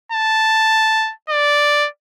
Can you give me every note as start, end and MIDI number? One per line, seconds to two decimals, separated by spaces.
0.12 1.12 81
1.30 1.88 74